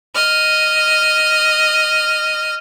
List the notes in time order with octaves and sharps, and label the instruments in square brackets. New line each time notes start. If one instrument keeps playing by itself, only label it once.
[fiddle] D#5 F6